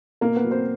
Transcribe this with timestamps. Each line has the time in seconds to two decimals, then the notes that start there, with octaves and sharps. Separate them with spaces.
0.21 B2 A#3 A#4
0.36 B3 B4
0.44 F#3
0.51 C4 C5